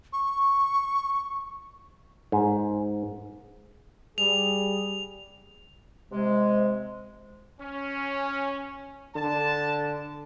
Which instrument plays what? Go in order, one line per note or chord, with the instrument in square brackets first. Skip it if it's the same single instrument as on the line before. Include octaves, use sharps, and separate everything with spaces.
[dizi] C#6
[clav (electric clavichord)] G#2
[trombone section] G3 G#4 [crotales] F7
[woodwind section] C3 G#3
[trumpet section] C#4
[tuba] D3 [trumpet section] A5